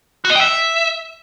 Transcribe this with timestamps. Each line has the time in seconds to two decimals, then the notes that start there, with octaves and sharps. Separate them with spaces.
0.25 F#4
0.30 D#5
0.35 G5
0.41 E5